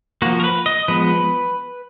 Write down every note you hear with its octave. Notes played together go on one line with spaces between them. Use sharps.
F3 A#3 F#4
A#4
B4
D#5
F3 G#3 B3 B4